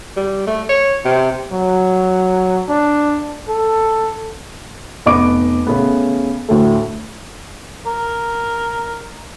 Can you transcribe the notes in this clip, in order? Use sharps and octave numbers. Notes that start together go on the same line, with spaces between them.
G3
A3
C#5
C3
F#3
D4
A4
F1 B3 D#5 D6 D7
C#3 A3 B3
D2 A2 A3
A#4